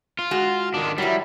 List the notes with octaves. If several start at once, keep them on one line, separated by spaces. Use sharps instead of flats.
F4
G#3 F#4
D#3 D4
F#3 G3 E4